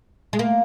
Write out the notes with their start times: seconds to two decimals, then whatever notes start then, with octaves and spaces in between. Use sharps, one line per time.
0.33 G#3
0.39 A#3